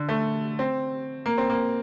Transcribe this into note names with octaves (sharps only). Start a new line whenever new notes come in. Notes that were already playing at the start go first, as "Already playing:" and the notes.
Already playing: D3
A3
C4
A#3
C4
A#3